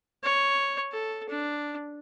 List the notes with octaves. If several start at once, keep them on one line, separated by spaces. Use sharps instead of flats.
C#5
A4
D4